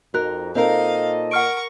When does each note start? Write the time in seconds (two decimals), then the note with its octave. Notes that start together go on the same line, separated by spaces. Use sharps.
0.14 F2 D#4 F#4 A#4 F#6
0.55 A#2 C4 D#4 A4 A#4 D#5 F5
1.31 A#4 F#5 C#6 F6 D7